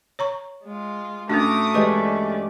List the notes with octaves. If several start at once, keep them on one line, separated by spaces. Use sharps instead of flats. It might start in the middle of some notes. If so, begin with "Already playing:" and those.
C#5 A#5 C#6
G#3 F4
A2 A3 C#4 D4 F#4 A#5 D6 D#6
G2 E3 G#3 C#4 G#4 B4 D5